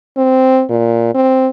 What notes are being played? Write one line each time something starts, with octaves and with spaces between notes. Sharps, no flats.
C4
A#2
C4